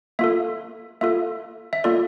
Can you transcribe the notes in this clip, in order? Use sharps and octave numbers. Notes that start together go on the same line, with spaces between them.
A#3 F4 A4 E5
A#3 F4 A4 E5
E5
A#3 F4 A4 D5